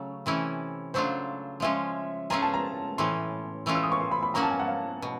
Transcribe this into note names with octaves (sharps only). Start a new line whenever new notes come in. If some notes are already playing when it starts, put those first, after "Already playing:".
Already playing: C#3 F#3 A3
C3 E3 A3 C#4 E4
C#3 F#3 A3 D4 F4 C5
F3 G#3 C#4 F4 E5
A3 C#4 F4 G#4 A#5
A5
A#5
A2 E3 A3 C#4 C6
E3 A3 C#4 F4
E6
D#6
C#6
C6
B5
B5
F#3 A#3 C#4 F#4 A#5
A5
G#5
F#5
F5
B2